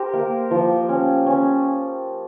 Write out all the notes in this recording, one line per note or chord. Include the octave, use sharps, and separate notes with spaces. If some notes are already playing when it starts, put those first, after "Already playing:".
Already playing: G4 A#4 C5
A#3
F3
C#4
C#4